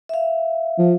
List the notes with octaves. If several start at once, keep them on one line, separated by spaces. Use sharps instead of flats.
E5 F5
F3